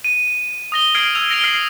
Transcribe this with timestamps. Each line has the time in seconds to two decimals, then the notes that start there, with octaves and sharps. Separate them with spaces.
0.04 D#7
0.72 D#6 A#6 G7
0.95 F6 G#6 C7 D7 F#7
1.15 E6 G#6 F7
1.30 A#6 D7 F7 G7
1.43 F6 C7 D7 F#7